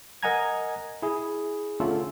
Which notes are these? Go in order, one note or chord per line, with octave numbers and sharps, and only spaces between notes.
A#4 D#5 F#5 G#5 A#5 G#6
E4 G#4
D3 A3 C#4 F4 A4